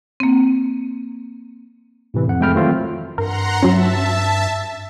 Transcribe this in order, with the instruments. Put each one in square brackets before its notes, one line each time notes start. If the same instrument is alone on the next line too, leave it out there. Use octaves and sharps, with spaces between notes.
[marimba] A#3 C4
[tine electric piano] A2 C3 E3
F2 F#5
F2 G#3 A3 G5 B5 F6
D#3 E3 F#3 A3 C4 F4
[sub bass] G2 [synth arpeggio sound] A#4 [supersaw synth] F#5 A#5 C6
[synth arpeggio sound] F#3 C#4 [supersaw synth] E5 A5